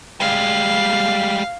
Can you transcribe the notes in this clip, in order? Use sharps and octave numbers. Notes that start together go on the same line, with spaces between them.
G3 G#3 F5